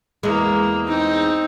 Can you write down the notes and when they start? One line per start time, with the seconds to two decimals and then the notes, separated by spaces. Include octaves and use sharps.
0.23 E2 G#3 A#3
0.88 C4 D#4